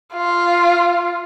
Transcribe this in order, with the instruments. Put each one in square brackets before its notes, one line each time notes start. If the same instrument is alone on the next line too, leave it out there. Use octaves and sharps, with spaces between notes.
[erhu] F4